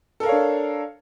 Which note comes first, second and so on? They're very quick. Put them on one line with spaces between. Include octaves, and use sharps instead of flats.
A4 A#4 F5 C#5 D4